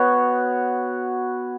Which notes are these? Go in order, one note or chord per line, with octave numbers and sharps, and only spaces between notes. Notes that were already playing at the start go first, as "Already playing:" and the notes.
Already playing: B3 F#4 C#5